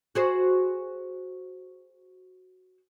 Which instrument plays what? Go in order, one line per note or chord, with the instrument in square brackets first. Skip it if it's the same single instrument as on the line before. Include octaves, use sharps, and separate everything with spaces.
[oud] F#4 G#4 C5